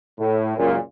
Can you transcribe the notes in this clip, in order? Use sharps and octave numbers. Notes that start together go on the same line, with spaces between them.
A2
C#2 F#2 A#2